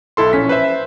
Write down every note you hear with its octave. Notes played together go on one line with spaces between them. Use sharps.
B1 E4 A4 C6
A#1 C#4 B6
B4 C5 E5